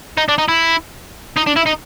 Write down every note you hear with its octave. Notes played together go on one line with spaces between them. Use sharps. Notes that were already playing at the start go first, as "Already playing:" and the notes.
D#4
D4
D#4
E4
D#4
D4
E4
D#4